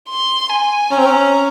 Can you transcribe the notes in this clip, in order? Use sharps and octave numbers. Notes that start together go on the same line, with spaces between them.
C6
G#5
C#4 A#5
C4
C#4